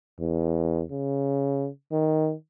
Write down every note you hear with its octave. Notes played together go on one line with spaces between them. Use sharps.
E2
C#3
D#3